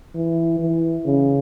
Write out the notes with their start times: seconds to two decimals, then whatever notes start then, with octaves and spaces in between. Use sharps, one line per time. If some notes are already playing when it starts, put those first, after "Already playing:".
0.15 E3
0.59 E3
1.05 C#3